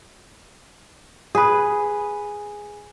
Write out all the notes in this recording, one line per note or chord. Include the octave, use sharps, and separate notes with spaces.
G#4 B4